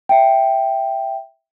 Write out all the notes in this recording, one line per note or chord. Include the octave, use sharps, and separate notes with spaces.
E5 G5